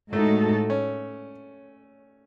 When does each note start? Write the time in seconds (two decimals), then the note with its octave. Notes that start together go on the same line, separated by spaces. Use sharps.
0.13 A2 G#3 A3 D#4 F#4 A4
0.70 C#4